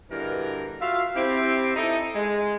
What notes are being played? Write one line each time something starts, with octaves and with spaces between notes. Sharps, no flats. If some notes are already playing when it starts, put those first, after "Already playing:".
G2 B2 D3 E3 A#4
F4 F#4 E5 F5
C4 E4 G4
D#4 E4 A4 D#5
G#3